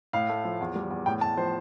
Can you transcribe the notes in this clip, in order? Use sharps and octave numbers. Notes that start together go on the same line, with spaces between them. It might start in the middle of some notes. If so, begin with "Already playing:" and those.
A2 F5
A3
F3
E2
G3
E2
A2 G5
A2 A5
F3 C5